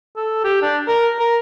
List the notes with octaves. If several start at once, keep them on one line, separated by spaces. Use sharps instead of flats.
A4
G4
D4
A#4
A#4